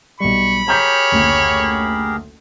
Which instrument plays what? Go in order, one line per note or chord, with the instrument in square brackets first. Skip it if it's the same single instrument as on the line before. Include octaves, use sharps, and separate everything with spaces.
[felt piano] B1 G3 [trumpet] B5 [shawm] C#6
[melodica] G4 G#4 A#4 [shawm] C#5 [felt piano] A#5 G6 B6
[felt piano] F#1 D2